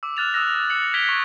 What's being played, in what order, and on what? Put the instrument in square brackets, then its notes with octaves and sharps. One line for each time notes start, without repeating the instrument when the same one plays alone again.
[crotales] D6 E6
F6 F#6 A6 F7
D#6 E6 F#6 A#6
E6 A6 C#7 F#7
G#6 B6 C#7 D7 F7 G7
C#6 G#6